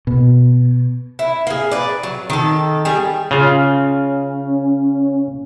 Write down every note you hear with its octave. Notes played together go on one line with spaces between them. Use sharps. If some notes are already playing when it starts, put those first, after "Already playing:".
B2
E4
A#3 G#4
B4 D5
F#3
D#3 A4
G3 G#4
C#3 C#4 F4